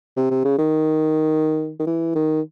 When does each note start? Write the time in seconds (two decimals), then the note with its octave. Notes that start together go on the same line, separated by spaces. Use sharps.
0.17 C3
0.31 C3
0.45 C#3
0.58 D#3
1.79 D#3
1.87 E3
2.15 D#3